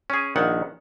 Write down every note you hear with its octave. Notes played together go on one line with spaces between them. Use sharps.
C#4 G#4
A#1 D#3 F#5